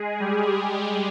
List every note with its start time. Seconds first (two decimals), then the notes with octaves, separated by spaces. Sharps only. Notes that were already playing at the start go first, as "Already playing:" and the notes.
Already playing: G#3 G#4
0.20 G3 G4